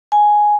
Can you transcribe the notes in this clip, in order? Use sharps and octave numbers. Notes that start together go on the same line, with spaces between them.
G#5